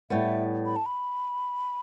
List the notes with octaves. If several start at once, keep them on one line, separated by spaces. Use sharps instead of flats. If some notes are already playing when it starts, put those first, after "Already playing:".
A2 G3 B3 E5
B5
A5
B5